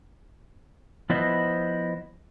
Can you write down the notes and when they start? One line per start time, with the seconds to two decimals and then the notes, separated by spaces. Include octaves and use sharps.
1.10 F3 B3 E4 B4 C5 D#5